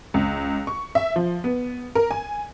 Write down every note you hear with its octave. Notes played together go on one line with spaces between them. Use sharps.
C#2
C#6
E5
F3
B3
A#4
G#5